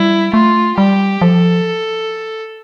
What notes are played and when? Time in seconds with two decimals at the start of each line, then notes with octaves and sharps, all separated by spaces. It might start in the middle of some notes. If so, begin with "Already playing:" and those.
Already playing: G3 E4
0.34 A3 F4
0.78 G3 G4
1.21 F3 A4